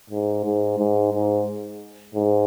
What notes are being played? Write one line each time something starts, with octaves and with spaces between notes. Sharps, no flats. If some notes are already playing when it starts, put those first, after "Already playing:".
G#2
G#2
G#2
G#2
G#2